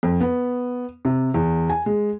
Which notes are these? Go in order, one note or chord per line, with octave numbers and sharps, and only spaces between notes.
F2
B3
C3
E2
G#5
G#3